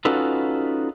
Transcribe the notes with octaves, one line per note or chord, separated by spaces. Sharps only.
C#4 D#4 F4 F#4 A4 B4